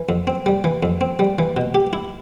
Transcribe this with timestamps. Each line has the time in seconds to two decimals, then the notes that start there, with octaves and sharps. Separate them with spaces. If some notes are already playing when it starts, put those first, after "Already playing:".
Already playing: E3
0.09 F2
0.27 C4
0.46 G3
0.64 E3
0.83 F2
1.01 C4
1.19 G3
1.39 E3
1.57 B2
1.75 G4
1.93 E4